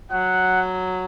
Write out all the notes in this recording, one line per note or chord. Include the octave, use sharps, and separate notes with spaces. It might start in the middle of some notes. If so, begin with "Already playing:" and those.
F#3 F#5